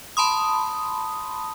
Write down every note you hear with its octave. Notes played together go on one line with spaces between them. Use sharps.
A5 B5 C6 D#6